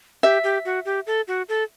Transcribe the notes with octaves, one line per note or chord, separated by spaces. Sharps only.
G4 E5
G4
F#4
G4
A4
F#4
A4